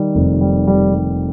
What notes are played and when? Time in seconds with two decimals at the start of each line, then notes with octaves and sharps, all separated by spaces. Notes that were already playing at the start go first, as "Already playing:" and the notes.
Already playing: D#3 G3
0.15 F1
0.41 G3
0.67 G3
0.94 G3